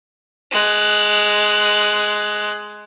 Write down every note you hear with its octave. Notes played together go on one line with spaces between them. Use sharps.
G#3 F#6